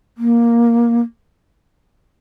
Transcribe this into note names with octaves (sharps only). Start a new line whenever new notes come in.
A#3